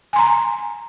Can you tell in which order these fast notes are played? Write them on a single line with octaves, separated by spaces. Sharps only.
G#5 C6 A#5